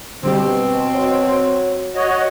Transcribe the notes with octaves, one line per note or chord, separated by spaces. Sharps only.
B2 D3 G3 C4 G4
F#3
F#4 C#5 D#5